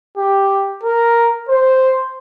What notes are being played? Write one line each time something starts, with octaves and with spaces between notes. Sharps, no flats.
G4
A#4
C5